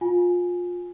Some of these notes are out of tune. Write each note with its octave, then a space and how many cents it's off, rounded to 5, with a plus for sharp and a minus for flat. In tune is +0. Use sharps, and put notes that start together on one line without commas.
F4 +25 G#5 +0